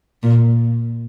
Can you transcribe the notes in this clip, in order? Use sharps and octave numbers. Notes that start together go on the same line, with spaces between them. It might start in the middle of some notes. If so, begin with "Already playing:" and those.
A#2